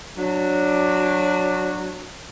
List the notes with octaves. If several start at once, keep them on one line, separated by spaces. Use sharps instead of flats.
F#3 D4